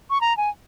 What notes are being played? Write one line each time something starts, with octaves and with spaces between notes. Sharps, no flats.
C#6
A#5
G#5